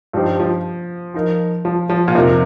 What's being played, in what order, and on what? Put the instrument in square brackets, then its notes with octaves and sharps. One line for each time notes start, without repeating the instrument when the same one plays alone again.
[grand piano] G2 G3 D#4 G4 C5 [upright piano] F3
[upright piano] F3
[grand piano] F3 D#4 A#4
[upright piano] F3
F3
A#2
[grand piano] F2 F3 D#4 A#4 [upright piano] C3